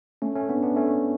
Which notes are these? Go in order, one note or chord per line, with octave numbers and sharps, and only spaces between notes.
A3 C#4
A3 C#4
B3 D4
B3 D4
A3 C#4